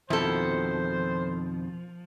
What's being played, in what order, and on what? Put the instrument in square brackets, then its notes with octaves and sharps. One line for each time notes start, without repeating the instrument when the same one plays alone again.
[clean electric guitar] F2 B2 D#3 [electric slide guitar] F3 [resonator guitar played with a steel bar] E4 A4 [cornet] C5